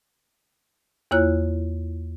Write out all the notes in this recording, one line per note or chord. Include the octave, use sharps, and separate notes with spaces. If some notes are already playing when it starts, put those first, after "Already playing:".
E2 A#3 E4 F4 C#5 F#6